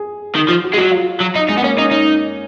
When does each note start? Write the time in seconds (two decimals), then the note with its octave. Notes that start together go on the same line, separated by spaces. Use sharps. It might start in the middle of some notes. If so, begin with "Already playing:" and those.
Already playing: G#4
0.35 D#3
0.49 F3
0.64 F#4
0.74 G#3
0.78 F#3 F#4
0.91 F4
1.20 F#3
1.35 D#4
1.49 G#3 D#4
1.57 B3
1.63 A#3 C#4
1.77 C#4 D#4
1.91 D#4